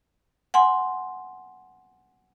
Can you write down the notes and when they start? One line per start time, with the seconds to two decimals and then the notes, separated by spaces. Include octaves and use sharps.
0.54 F#5 G#5 C6